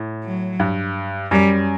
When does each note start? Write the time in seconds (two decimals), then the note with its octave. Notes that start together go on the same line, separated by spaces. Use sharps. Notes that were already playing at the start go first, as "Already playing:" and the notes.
Already playing: A2
0.24 F#3
0.60 G2
1.31 F#2 G3